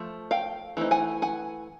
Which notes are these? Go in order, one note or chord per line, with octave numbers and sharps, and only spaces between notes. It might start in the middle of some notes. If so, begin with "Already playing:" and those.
Already playing: F3 A3
F5 G5
E3 A3 C4 D#4
F#5 G#5
F#5 G#5